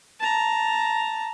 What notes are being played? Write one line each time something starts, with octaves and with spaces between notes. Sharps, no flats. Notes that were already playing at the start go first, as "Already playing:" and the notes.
A5 A#5